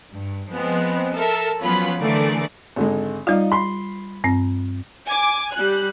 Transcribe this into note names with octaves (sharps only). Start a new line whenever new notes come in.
G2
F3 G#3 B3 C4
A4 A#4 E5
F3 F#3 B3 C#4 F4 B5
D3 E3 A3 G#4 A#4 D5
G#1 D3 G#3
G3 D#4 F4 D5 F5
B5 C6
G2 C4
G#5 D6
G3 F#6